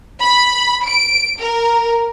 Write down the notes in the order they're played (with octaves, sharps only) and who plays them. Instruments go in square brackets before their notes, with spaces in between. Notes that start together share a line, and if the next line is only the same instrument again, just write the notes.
[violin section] B5
D7
A#4